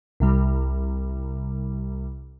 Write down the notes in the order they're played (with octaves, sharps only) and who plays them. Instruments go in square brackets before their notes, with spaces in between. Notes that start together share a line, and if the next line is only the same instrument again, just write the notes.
[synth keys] C2 C3 G3